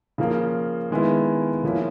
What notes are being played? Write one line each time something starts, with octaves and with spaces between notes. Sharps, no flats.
C#3 F3 A#3
D#3 G#3 B3 E4
C#3 F3 A#3 C#4 E4